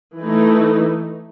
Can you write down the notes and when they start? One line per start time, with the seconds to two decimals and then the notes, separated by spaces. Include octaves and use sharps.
0.18 E3 A3 D#4